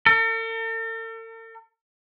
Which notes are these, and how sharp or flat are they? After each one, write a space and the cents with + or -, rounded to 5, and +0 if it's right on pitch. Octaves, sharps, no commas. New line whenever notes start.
A4 +45